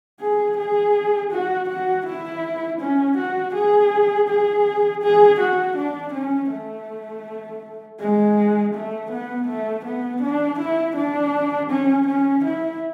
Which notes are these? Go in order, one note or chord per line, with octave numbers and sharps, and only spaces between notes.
G#4
G#4
F#4
F#4
E4
C#4
F#4
G#4
G#4
G#4
F#4
D4
C#4
A3
G#3
A3
B3
A3
B3
D4
E4
D4
C#4
C#4
E4